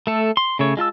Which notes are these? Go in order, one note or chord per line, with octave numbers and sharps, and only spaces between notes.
A3 A4
C6
C#3 A3 C#5
G#3 F4 A5 E6